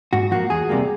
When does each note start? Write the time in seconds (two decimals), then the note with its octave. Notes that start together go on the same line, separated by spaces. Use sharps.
0.13 G#2 F#4
0.31 F3 A#3 F#4
0.50 E2 G#4
0.69 C3 D#3 G3 A#3